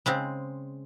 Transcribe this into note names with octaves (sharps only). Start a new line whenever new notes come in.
C#3 G#3 C4